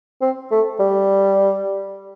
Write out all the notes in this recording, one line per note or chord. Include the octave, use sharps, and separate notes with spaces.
C4
A3
G3